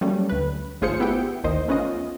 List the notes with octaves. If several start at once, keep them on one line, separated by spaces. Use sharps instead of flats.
F#3 G3 A3 A#3 C#4
D2 B4
G#1 A3 F4 G#4 C5 C#7
B3 E4 G4 G5
A1 D#2 A#3 C5 D#5
A3 B3 C#4 F4 D#5